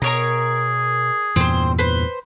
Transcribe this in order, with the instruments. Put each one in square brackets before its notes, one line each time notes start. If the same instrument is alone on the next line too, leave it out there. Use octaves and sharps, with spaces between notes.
[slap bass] B2 [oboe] G#4 [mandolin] A#4 C#5 A#5
[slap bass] E2 G2 A#2 [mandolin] C4 C5
[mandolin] B4 C5